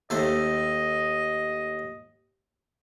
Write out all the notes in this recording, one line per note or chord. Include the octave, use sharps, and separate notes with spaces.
D#2 A3 C5 D#5